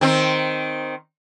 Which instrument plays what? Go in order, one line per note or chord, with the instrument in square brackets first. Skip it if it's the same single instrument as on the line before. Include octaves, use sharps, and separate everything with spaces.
[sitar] D#3 C4